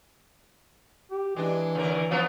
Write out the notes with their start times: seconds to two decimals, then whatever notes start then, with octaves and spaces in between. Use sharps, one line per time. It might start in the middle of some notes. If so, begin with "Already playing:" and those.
1.11 G4
1.37 E3 G#3 D4
1.75 D#2 D3 A#4
2.11 F3 B3 F4